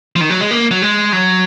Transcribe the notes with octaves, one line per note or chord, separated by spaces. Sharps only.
F3
D#3
F#3
G#3
A#3
F#3
G#3
F#3